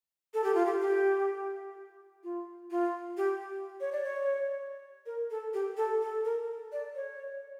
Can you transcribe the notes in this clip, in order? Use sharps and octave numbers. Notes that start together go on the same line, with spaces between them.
A4
G4
F4
G4
G4
F4
F4
G4
C#5
D5
C#5
A#4
A4
G4
A4
A4
A#4
D5
C#5